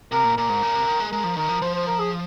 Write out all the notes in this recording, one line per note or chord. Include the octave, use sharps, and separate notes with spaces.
C3 A#4
A#2
A#2 A#4
G#2
A#2
C3
D#3
G#3
G#3 A#4
F3
D#3 A#4
F3
F3 C5
C5
A#4
G#4